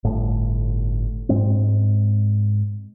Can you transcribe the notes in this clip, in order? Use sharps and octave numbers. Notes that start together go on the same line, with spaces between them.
G1 A2
G#2 G#3 C4